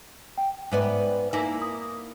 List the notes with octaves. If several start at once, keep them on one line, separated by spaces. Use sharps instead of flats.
G5
G#2 B3 B4 D5 E5 G#5
A#3 D#4 E4 G#5
D#6